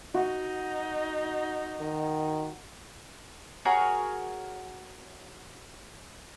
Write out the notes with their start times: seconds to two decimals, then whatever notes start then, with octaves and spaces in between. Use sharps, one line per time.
0.14 D#4 F#4
1.81 D#3
3.65 F#4 G#4 A#4 C#5